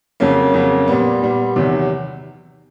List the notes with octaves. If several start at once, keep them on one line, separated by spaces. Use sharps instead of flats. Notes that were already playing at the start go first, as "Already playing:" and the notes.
F2 C#3 F#3 A#3
F2 C#3 F#3 A#3
A#2 G3 B3
A#2 G3 B3
E2 C3 D#3 F#3